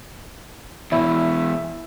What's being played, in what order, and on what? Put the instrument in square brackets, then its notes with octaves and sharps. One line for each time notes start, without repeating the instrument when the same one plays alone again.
[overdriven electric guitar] E2 B2 [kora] E4 [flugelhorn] E5